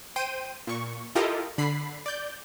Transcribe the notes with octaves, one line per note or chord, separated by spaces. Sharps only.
C5 G5 D#7
A#2 C#6
E4 F4 G4 A4 A#4 D#5
D3 B5 C7
D5 G6